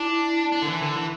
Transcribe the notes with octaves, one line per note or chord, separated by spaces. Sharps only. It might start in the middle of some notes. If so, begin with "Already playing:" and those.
Already playing: D4 E4
D4
D3
E3
D3
E3